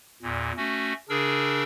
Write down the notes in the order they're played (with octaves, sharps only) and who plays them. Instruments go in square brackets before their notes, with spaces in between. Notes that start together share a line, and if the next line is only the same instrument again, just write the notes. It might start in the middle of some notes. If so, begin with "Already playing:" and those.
[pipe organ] E2 A#2
A3 C#4 F#4
C#3 D4 G#4 A#4 E6